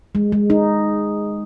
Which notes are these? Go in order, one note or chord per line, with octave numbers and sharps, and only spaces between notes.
G#3
G#3
D#4